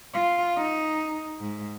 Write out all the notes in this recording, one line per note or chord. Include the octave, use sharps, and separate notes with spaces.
F4
D#4
G#2